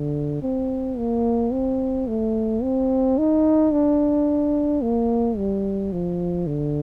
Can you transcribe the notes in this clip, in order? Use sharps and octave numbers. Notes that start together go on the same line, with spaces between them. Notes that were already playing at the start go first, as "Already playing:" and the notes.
Already playing: D3
C4
A#3
C4
A3
C4
D#4
D4
A#3
G3
F3
D3